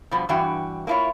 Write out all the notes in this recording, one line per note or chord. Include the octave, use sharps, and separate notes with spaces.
B2 F3 G3 B3
G2 E3 F#4 G5
A#3 D4 E4 F4 C#5